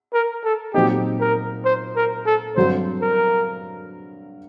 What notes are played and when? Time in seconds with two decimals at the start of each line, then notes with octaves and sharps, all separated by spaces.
0.13 A#4
0.44 A4
0.74 A#2 F#3 C4 D#4 G4
1.20 A#4
1.65 C5
1.96 A#4
2.26 A4
2.56 G2 D3 F#3 C4 C5
3.02 A#4